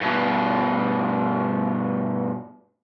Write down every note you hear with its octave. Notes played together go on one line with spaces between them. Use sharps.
G2 B2